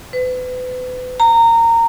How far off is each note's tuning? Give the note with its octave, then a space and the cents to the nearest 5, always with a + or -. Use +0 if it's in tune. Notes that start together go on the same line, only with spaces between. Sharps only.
B4 +35
A#5 -20